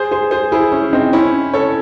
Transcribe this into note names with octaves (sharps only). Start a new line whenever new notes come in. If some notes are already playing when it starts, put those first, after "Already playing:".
Already playing: G#4 C5
G#4 C5
G#4 C5
E4 G#4
C#4 E4
C4 D#4
C#4 E4
A4 C#5